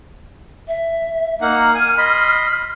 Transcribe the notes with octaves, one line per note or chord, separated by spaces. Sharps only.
E5
A#3 D#4 F#5 F6
G#5
D#5 B5 C6